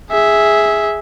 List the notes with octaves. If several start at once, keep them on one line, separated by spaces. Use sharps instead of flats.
G#4 E5